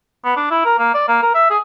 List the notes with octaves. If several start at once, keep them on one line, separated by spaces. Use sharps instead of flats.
B3
D4
E4
A#4
A#3
D5
A#3
A#4
E5
G#4